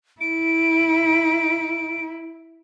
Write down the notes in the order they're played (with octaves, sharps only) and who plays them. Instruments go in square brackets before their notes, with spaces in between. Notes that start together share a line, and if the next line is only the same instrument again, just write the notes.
[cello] E4 [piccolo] D7